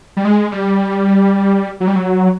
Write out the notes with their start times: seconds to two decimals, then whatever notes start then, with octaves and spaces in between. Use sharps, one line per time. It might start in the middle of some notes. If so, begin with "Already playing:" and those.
0.17 G3
0.25 G#3
0.52 G3
1.80 F#3
1.87 G3
1.96 F#3